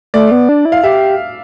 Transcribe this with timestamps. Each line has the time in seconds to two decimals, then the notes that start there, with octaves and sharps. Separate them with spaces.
0.14 A3 D5
0.31 B3
0.49 D4
0.65 E4
0.72 F5
0.83 G4 E5